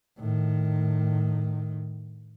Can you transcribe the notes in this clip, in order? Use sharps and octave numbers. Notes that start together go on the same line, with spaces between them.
A2 D#3